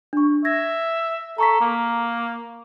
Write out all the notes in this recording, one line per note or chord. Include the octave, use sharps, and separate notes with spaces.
D4 C#6
E5 G#6 A#6
A4 A#5 C#6 B6
A#3